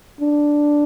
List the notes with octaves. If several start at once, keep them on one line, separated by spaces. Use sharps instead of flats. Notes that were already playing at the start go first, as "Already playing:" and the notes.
D4